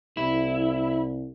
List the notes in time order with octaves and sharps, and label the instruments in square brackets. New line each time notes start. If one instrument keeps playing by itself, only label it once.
[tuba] C2 [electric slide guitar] E4